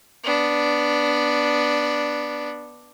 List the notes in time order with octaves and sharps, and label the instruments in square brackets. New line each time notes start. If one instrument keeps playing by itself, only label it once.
[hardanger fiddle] B3 D4